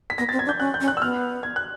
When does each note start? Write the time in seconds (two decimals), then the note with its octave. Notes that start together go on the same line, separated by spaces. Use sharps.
0.10 B6
0.18 B3 A#6
0.29 C4 A6
0.39 G#6
0.46 D4
0.49 G6
0.60 C#4 F#6
0.74 G6
0.81 C#4
0.88 F#6
0.97 E6
1.01 B3 F6
1.43 G#6
1.56 F#6